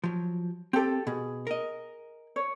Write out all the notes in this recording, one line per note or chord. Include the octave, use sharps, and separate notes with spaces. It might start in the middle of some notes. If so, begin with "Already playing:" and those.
F3 F#3
C4 G4 A4
B2 G#4
A#4 D#5
C#5